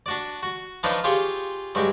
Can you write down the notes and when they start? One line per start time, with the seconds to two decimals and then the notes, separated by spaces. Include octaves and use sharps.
0.06 D4 F#4 D5
0.43 F#4
0.83 F3 D4 D#4 F4 B4 C#5
1.04 F4 G4 G#4 C#5 F5 C6
1.75 G2 F#3 G#3 G5